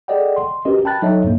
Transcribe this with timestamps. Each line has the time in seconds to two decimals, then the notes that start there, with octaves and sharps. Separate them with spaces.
0.08 G#4 A4 D5 D#5 F#5 G5
0.36 C6
0.65 C#4 F#4 G4 A#4 B4 D#5
0.85 G5 A5 B5 F#6 A6
1.02 F#3 D#4 A4 C#5 D#5 E5
1.24 G2 B2 A#3